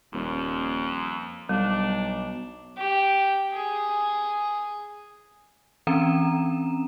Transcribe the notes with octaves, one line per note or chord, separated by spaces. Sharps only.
D#1 F2
B1 G3 D4
G4
G#4
E3 C4 C#4 A#5 E7